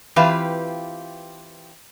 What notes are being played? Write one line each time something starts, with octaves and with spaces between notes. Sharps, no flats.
E3 C4 F4 G4 B4 F5